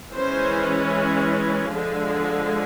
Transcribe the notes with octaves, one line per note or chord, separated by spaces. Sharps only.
E3 G#3 C#4 C5
D3 F3 G#3